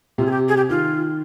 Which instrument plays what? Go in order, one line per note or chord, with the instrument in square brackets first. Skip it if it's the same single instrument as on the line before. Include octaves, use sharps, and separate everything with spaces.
[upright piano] C3 [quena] F4
[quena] G#4
G4
G#4
G4
[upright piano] D#3 [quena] F4